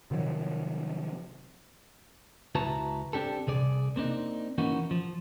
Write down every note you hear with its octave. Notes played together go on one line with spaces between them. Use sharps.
C3 D#3 F3 F#3
C#2 E4 F#4 B4 A5 A#5
C4 D4 G4 A4
C2 C3 G#4 D5
A#3 C4 D4 D#4
E3 A#3 C#4 D#4 F#4
F3